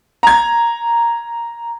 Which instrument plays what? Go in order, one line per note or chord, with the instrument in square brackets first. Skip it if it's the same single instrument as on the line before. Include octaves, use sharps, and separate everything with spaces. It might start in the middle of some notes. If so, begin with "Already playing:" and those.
[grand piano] A#5 G#6